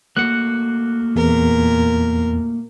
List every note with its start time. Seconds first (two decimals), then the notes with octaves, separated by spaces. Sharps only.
0.17 A3 A#3 F#4 F#6 C#7
1.16 E2 A#2 A#4